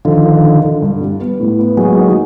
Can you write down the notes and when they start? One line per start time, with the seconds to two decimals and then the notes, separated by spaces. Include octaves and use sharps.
0.05 D3 D#3 F3
0.25 D3
0.44 D3
0.62 D3
0.82 G2
1.01 G3
1.20 B3
1.40 A2
1.59 B3
1.77 F#3 G#3 A#3
1.97 D#4